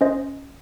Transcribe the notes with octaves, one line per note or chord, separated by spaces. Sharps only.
C#4 C5 D#5